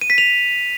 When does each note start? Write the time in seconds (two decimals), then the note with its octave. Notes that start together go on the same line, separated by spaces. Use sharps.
0.01 D#7
0.10 B6
0.18 F7